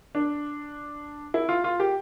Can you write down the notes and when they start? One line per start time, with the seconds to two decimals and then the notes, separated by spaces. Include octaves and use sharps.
0.15 D4
1.34 E4
1.49 F4
1.64 F4
1.80 G4